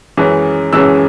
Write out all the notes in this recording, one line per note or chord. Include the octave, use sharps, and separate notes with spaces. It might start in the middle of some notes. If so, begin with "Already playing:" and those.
F#2 E3 G#3 C#4
F#2 E3 G#3 C#4 E6